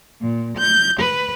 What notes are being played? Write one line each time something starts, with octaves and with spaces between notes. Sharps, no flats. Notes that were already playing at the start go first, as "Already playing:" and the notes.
A#2
G6
B4